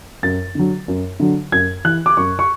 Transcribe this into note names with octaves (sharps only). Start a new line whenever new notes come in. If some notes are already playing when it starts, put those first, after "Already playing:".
F#2 A6
D3 F#3
F#2
D3 F#3
F#2 G#6
E3 F#6
D6
F#2 C#6
C#6